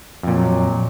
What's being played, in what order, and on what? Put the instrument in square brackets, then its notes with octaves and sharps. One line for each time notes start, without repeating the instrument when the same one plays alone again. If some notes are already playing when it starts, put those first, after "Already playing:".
[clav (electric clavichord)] F2 A#2 [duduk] F#3